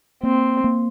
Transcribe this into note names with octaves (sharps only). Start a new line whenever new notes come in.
A#3 C4
A#3